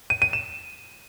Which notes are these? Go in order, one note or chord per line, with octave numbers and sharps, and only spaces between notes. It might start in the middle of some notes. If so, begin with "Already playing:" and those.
D#7
D#7
E7